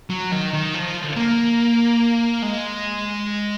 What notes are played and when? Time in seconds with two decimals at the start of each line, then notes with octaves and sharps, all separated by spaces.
0.10 F#3
0.32 D#3
0.53 D#3
0.74 F3
1.16 A#3
2.42 G#3